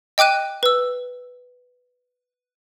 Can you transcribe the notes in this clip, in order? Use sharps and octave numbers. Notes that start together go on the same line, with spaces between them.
D#5 G5 D6 F#6 D#7
B4 E6